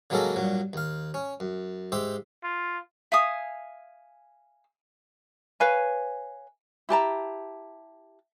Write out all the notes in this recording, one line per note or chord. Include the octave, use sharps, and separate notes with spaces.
C#3 F#3 G#3 A#3 C#4 A4
G2 A#2 F#3
D#2 F5
C#4
F#2
G#2 G4 E5 C6
F4
E5 F5 G#5 D#6
B4 C#5 F5 G#5
E4 G4 A5 A#5